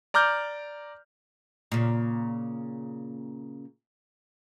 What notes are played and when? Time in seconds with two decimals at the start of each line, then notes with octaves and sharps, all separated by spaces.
0.14 D5 A#5 D6 F6 G6
1.72 A#2 C#3